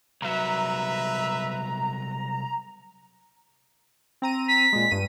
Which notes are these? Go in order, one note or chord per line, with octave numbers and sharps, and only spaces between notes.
C2 F#3 B4 E5 A#5
C4 A#5 D#7
B6
A#2 G#3
G2 D#7